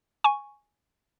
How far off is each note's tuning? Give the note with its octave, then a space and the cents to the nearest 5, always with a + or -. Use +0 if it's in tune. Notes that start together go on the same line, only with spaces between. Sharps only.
G#5 +0 C#6 +0